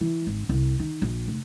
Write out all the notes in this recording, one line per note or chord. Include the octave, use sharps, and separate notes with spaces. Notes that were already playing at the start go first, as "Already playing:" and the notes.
E3
G#1
C2
D#3
A#1
F1